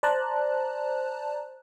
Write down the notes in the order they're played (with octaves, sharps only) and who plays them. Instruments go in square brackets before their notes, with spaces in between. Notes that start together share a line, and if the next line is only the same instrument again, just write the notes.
[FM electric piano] C5 D5 A5 A#5 F#6